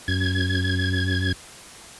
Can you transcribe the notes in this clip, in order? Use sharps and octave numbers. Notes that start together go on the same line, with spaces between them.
F#2 G#6